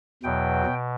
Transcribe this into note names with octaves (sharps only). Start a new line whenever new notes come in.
E2 B2 F#3 G5
B2